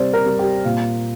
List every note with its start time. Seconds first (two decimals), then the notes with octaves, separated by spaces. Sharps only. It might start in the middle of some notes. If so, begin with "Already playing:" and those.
Already playing: C3 G3 C5 D5
0.13 A#4
0.26 G3
0.39 G4
0.65 A#2 F4